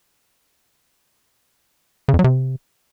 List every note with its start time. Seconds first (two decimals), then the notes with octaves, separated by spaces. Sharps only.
2.08 C#3
2.14 F2
2.19 F#3
2.24 C3